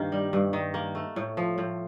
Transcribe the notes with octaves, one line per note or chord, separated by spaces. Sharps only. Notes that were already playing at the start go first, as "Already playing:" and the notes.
Already playing: G2 D#3 A#3
G3
G2
D#3
A#3
A3
A2
F3
A2